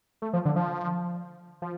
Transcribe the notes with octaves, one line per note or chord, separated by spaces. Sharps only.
A3
F3
D3
F3
F3